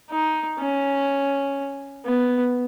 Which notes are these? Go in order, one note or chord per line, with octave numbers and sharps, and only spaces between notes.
D#4
C#4
B3